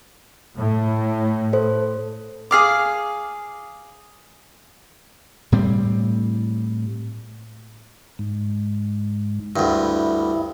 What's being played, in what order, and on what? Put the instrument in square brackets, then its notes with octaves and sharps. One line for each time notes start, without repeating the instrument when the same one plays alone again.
[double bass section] A2
[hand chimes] A4 C5
[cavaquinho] G#4 F5 D6
[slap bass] A2 G3 C4
[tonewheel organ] G#2
[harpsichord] D2 G2 [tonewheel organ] E4